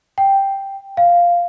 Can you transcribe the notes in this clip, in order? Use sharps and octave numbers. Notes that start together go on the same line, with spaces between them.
G5
F5